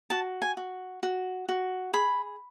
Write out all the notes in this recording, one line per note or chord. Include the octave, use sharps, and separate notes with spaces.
F#4 A5
G#5
F#4
F#4
F#4
G#4 B5